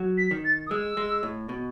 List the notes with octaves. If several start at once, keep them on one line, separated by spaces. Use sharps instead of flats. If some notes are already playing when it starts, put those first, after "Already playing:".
Already playing: F#3
B6
D#3
A6
D#6
G#3 E6
G#3
A2
B2